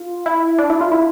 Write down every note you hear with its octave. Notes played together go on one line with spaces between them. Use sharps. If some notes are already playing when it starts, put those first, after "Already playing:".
Already playing: F4
E4
D4
E4
F4
E4